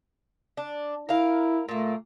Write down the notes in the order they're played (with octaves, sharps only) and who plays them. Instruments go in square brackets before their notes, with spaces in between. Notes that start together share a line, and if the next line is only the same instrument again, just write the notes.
[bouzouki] D4
[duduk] E4 [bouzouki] A#4 F5
[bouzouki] A#2 A#3 [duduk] A3